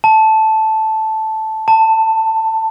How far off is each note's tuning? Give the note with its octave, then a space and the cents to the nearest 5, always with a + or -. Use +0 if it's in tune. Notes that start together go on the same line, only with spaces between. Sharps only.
A5 -5
A5 +15